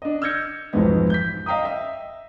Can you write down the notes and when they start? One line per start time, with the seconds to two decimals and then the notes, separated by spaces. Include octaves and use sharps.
0.02 D4 D#5
0.22 E6 F6 G6 G#6 A#6 C#7
0.73 B1 F2 G#2 E3 G#3 B3
1.10 G6 B6
1.46 D#5 F5 G5 A#5 D#6
1.63 D#5 E5